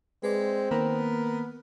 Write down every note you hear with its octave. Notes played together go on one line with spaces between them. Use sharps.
G#3 C4 B4 D5
D#3 A#3 B3 A#4